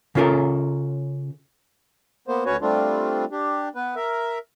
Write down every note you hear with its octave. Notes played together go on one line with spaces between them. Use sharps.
C#3 C#4 F4 A4 A#4
A#3 B3 C5
D2 C#4 F#4 B4 C#5
G3 A3 C4 D4 F4
D4 G4
B3 B4
A#4 E5